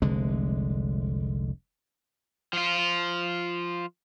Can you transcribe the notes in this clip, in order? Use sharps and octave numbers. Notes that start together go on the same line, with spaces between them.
F1 C2 D3 G#3
F3 F4